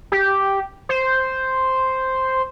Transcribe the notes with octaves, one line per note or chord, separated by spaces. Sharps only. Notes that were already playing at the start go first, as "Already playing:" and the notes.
G4
C5